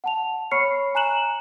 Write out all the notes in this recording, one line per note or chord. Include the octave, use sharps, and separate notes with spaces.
F#5 A5 F7
C#5 B5 C#6 F6 C7 C#7
G#5 A#5 F#6 E7 F#7